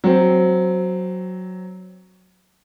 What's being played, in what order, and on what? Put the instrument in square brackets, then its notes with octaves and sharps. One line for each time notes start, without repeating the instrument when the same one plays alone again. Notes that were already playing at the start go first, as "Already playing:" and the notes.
[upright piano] F#3 C4